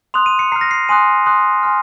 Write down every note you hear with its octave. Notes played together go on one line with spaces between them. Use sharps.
C6 D#6 F#6 F7
D#7
C#7
A#5 F6 C7
A#6
C7
G#5 C6 D#6 F#6 D#7
C6 D#6 F#6
G#5 C6 F6